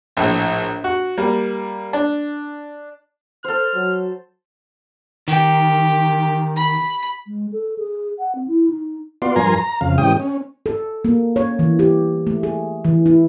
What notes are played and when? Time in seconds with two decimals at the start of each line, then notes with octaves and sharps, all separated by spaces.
0.17 A#1 A2
0.84 F#4
1.17 G3 A#3
1.93 D4
3.45 A4 C5 F6
3.75 F#3
5.28 D#3 G4
6.56 B5
7.27 G#3
7.52 A4
7.78 G#4
8.19 F#5
8.35 C4
8.48 E4
8.70 D#4
9.22 B3 F4 F#4 D5 C6
9.36 G2 F3 A#4 G#5 A#5 C6
9.56 A#5
9.81 F2 C#3 F5
9.98 G#2 E3 C#4 G4 G5 D#6
10.20 C#4
10.66 A4
11.05 A#3
11.36 C#5
11.59 E3
11.79 G4
12.27 A3
12.43 G#4
12.84 E3
13.06 E4